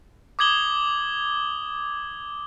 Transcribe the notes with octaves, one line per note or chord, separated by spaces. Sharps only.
D6 D#6 G#6 F#7 G7